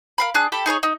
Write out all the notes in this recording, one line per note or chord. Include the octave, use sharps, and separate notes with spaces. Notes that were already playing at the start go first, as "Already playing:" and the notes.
A#4 F5 B5
D4 G#4 F#6
G4 A4 B5
D#4 G#4 B4 C#5
D#4